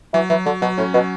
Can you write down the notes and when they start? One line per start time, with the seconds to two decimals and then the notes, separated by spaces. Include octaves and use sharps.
0.14 E3 F#3
0.30 E3 F#3
0.46 D3 F#3
0.62 B2 F#3
0.78 A2 C#4
0.94 B2 F#3